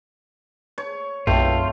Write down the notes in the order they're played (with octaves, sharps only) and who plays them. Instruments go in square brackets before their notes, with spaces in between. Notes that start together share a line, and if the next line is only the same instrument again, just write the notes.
[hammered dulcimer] C#5
[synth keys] B1 [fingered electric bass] F#2 C4 [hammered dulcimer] A3 G5 [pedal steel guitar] F4